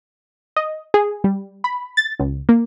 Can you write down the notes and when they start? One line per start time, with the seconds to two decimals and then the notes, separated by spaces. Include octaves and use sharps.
0.56 D#5
0.94 G#4
1.24 G3
1.64 B5
1.97 A6
2.19 C#2
2.49 A#3